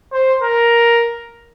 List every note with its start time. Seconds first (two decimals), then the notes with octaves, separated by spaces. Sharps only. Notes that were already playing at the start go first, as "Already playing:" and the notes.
0.12 C5
0.42 A#4